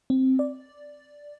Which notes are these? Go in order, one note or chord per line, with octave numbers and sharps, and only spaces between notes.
C4
D5